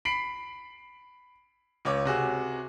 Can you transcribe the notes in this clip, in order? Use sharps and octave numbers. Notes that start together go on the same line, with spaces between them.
B5 B6 C7 D7 F#7
C#2 C#5 D6
C3 F#4 G#4